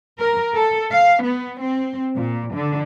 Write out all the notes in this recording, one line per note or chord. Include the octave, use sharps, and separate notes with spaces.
A#4
A4
F5
B3
C4
A#2
D3